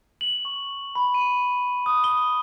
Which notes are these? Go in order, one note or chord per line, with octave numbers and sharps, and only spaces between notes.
F#7
C#6
B5
D#7
D#6
G7